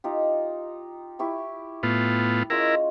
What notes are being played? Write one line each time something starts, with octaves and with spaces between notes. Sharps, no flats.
D#4 F4 G4
E4 G4 C#6
A2 B3 F4
G#3 C#4 E4 F4 A#4